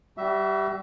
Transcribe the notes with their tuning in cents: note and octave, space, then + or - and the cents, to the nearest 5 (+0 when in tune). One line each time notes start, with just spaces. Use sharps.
G3 -10 F#4 +40 E5 +0